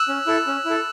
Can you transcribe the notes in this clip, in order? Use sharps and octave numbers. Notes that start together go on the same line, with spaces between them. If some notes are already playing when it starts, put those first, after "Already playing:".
Already playing: E6 F#6
C#4
E4 A4
C#4
E4 A4